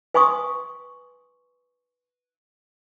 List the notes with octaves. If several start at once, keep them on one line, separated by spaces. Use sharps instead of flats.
B4 G#5 C6 C#6 D#6